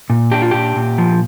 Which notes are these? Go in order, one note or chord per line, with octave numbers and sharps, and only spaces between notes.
A#2
D4 G4
F4
A#2 G4
A#2
F3